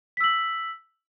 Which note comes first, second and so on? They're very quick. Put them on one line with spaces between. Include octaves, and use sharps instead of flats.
B6 E6 F#7